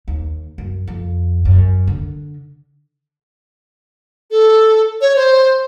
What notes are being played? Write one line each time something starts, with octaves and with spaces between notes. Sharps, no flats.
D#2
F#2
F2
F#2
D3
A4
C#5
C5